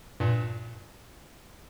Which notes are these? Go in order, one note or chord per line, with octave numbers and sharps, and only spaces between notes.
G2 A#2